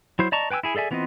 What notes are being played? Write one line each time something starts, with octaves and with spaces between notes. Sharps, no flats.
F#3 E4 C5
D5 D#5 A5 A#5 C#6
B4 G5 G#5 D6 E6
E4 G#4 G#5
G#4 A4 D5 E5 G#5
E3 B3 C4 F4 D#5